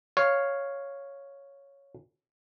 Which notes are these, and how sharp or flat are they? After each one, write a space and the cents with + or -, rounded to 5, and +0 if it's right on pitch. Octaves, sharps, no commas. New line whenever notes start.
C#5 +0 F5 +0